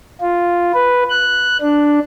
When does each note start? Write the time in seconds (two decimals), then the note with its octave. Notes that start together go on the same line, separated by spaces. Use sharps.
0.21 F4
0.74 B4
1.10 F#6
1.61 D4